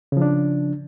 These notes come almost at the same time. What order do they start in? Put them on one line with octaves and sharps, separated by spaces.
C#3 F3 D4